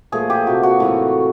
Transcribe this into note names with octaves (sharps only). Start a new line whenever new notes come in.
A#2 F3 A3 G#4
G4
C3 F3 A#3 F#4
F#4
A2 E3 A3